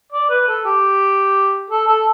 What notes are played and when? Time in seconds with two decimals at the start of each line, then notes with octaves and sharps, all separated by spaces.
0.12 D5
0.29 B4
0.48 A4
0.65 G4
1.70 A4
1.87 A4